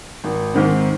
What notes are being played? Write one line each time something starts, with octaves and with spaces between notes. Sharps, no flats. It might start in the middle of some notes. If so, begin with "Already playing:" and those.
G#1
G#2 D#3 C4